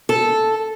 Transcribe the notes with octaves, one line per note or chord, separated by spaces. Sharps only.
A4